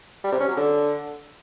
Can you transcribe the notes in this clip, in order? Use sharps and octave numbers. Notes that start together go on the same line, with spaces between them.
G3
C3
C#4
F#3
D3